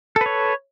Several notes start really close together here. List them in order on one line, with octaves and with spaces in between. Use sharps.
A4 B4 C#5